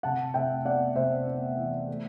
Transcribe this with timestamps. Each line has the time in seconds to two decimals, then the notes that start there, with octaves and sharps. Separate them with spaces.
0.03 C3 F#5 A5
0.34 C3 E5 G5
0.65 B3 D5 F#5
0.95 C3 C5 E5
1.27 B3
1.57 E3
1.88 A3